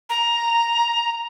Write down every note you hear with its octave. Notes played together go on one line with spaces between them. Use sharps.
A#5